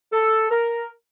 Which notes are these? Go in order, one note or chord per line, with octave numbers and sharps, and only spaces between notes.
A4
A#4